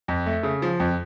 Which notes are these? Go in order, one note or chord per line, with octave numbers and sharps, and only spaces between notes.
F2
A3
C#3
F3
F2